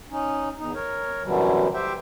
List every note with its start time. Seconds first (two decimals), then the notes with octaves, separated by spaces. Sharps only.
0.11 C#4 D#4
0.59 E2 D#4
0.74 A#4 C#5
1.23 F#2 B2 D3 E3 F#3 G3
1.74 G4 C5 E5 G5